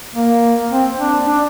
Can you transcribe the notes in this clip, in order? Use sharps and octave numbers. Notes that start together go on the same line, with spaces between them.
A#3
C4
D4
D4